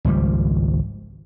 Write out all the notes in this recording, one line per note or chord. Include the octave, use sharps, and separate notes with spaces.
G#1 C#2 F3 G3